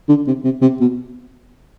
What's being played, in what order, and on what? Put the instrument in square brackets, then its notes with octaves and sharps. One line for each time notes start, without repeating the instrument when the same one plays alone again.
[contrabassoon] D3
C3
C3
C3
B2